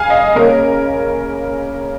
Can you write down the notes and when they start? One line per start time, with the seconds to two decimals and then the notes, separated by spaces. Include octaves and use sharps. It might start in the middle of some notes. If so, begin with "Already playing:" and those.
Already playing: C#3 F5 G#5
0.10 D#5
0.35 C#3 A#3 C#4 A#4